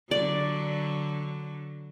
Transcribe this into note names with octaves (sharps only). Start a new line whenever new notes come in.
D3 F#3 D5